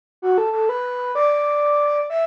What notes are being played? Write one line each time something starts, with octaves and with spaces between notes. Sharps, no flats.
F#4
A4
A4
B4
D5
E5